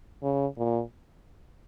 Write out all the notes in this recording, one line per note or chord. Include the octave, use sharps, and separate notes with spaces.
C#3
A#2